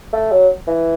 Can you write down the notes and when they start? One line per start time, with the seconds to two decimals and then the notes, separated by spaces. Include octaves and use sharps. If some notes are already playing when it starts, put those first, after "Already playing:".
0.13 A3
0.32 F#3
0.67 E3